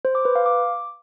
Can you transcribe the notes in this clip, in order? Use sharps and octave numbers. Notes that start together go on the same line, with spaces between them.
C5
D6
B4
F5
D6